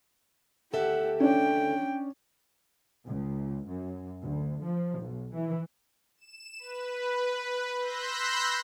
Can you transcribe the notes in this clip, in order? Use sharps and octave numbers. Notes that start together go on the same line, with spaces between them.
D2 G4 A4 E5 F#5
C#4 D4 G5
C#2
F#2
D2
F3
B1
E3
E7
B4
B5 C6 E6 F#6 G6 A#6